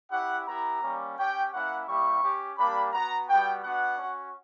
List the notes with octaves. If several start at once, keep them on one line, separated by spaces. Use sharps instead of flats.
C#4 E4 G4 F#5
B3 E4 G4 A#5
G3 A#3 C#4
C#4 G4 G5
A#3 C#4 E4 F#5
G3 A#3 E4 G4 C#6
C#4 G4
G3 A#3 D4 G4 B5
B3 F#4 A#5
G3 B3 F#4 G5
B3 D4 F#4 F#5
C#4 F#4